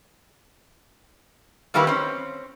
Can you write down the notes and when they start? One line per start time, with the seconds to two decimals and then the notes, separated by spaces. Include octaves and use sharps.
1.74 D#3 G3 A#3 E4 G4 B4
1.87 C4 C#4